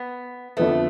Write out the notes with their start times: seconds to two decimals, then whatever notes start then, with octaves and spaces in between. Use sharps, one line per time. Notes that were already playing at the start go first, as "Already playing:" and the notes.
Already playing: B3
0.57 F2 D3 F3 A3 B3